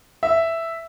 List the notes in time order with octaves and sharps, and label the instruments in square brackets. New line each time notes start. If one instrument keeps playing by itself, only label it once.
[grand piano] E5